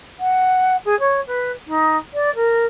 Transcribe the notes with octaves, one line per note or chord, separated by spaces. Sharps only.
F#5
G#4
C#5
B4
D#4
D5
A#4